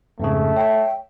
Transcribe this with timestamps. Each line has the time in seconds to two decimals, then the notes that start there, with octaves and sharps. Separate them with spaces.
0.20 F2 G#2 C#3 A3
0.57 C#5 E5 G5